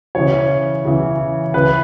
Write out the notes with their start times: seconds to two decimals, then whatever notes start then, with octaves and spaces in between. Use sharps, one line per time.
0.15 C#3 E3 C#5
0.85 C#3 E3
1.54 C#3 E3 B4